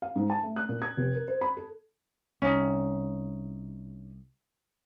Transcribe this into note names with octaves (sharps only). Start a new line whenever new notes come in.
F5
G#2
A5
A3
F#6
A#2
G#6
F1
A#4
C5
B5
A4
C2 C#4 D#4